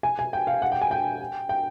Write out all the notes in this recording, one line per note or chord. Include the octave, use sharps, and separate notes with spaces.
G#5
G#5
G5
F5
F#5
G5
G#5
G5
G5